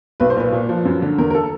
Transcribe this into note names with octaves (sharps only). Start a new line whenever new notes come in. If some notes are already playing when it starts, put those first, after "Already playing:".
B1 B4
C5
A#2 B4
A#2
F3
F#2
D3
E2 A#4
A#4
A4